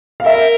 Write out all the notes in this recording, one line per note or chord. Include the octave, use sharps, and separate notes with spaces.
F5
A#4 E5